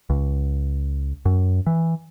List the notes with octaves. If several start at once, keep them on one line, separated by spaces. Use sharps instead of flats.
C#2
F#2
E3